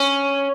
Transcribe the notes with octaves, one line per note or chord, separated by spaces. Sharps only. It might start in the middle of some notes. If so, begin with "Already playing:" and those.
Already playing: C#4